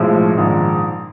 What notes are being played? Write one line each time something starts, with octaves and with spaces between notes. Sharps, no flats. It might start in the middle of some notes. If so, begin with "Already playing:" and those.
Already playing: B1 A2 F3 G#3
A#1 G#2 D#3